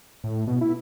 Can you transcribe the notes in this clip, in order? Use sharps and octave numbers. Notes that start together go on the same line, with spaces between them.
A2
B2
E4